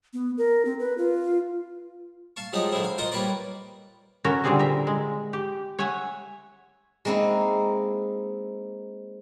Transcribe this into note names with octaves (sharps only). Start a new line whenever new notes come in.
B3
A#4
C4
B4
F4
F5 A5 C#6
F3 F#3 G#3 D#4 F4 G4
D3 D#3 F3 C4 E4
F5
F4 A#4 C5 D#5 F#5 C#6
G3 A#3 B4 C#5 D5
C#4 E4 F#4 A4 A#4
A#2 D3 G3 C4 G#4 A5
A#4 E5
G#3
G4
C#5 E5 F#5 G#5
G#3 A#3 C4 D#4 E4